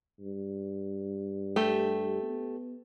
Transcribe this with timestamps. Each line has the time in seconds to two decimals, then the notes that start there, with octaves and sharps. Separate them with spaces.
0.20 G2
1.56 A3 G4
2.22 B3